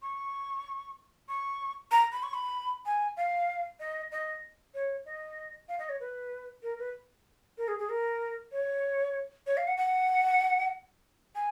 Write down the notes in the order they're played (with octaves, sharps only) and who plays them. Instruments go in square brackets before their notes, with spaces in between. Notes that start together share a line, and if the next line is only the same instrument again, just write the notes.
[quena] C#6
C#6
A#5
B5
C#6
B5
G#5
F5
D#5
D#5
C#5
D#5
F5
D#5
C#5
B4
A#4
B4
A#4
G#4
G#4
A#4
C#5
C#5
F5
F#5
F#5
G#5